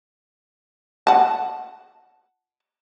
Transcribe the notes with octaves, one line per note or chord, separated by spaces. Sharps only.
F#5 A5